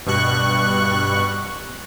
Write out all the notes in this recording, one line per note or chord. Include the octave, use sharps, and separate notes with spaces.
G2 B2 G3 C#6 F#6